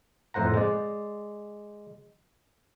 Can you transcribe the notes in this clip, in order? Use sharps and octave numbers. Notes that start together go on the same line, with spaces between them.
F2 A2 C5 F#5 A#5
G#3 D5